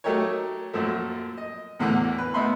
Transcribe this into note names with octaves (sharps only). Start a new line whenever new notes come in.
F#3 A3 D#4 G4 A#4 C#5
F#2 A#2 F3 A3
D#5
E2 A2 D3 E3
B4
A2 B3 D#4 E5 B5 C6